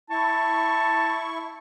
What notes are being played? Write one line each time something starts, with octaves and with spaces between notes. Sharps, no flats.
E4 A5 C#6